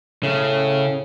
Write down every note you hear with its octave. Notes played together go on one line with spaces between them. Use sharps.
A2 C#3